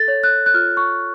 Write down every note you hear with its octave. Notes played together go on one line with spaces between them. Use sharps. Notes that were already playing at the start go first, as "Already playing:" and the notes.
Already playing: A4 A6
C#5
F#6
F#6
F4 F6
C#6